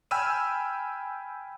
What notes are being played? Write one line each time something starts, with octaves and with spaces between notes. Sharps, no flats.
G5 G#5 B5 E6 F6 D#7